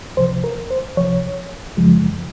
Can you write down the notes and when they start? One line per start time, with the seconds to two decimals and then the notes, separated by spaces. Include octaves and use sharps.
0.17 C#2 C3 F3 C5
0.44 A#4
0.71 C5
0.97 C#2 C3 F3 C#5
1.77 F#2 C#3 F3 G#3